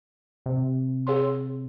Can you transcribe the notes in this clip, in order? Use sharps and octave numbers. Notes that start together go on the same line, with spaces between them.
C3
G#4 C#5 C6